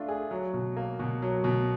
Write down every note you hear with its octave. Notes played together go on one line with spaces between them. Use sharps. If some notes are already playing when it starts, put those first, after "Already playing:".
Already playing: A3 D4 F4
G#4
F#3
B2
A#3
B2
F#3
B2